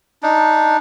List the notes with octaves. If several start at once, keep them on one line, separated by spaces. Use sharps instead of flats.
D4 D#4